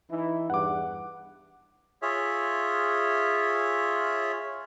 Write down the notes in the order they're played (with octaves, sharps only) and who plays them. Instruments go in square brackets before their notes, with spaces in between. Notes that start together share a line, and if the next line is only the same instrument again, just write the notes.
[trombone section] E3 D#4 E4
[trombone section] E2 G2 [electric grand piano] F#5 D6
[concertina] F4 G#4 C#5 E5